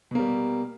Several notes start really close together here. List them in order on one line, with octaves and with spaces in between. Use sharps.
B2 A#3 G3